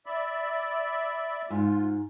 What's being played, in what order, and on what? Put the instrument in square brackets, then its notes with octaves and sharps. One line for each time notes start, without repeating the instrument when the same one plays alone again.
[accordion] D5 E5 B5
[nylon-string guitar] G#2 [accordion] F4